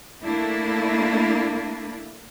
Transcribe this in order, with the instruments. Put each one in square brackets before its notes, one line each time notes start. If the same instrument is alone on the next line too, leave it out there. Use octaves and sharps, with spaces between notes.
[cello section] A3 A#3 D4 E4